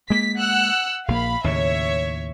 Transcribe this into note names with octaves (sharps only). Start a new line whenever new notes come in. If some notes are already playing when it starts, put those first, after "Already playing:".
G#3 A#3 B6
F#5 E6 F#6
A#1 A#3 F5 B5
D#2 A2 C#3 C#5 E5